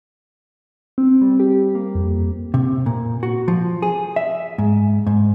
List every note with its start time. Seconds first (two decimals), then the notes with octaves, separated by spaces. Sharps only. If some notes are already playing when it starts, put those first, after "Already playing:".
0.98 C4
1.21 G3
1.40 G4
1.75 A#3
1.95 F2
2.54 C3
2.86 A#2
3.23 F#4
3.48 F3
3.82 G#4
4.16 E5
4.58 G#2
5.07 G#2